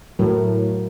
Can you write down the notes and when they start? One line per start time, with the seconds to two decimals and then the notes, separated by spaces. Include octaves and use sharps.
0.19 A2 F#3 A#4